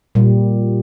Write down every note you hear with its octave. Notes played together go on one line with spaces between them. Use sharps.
A#2 G3